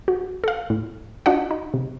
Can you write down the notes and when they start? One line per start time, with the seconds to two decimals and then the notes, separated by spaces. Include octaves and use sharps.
0.08 F#4
0.44 A4 F5
0.70 A2
1.26 D4 F4 F#4 D#5 F#5
1.51 D#4
1.74 C3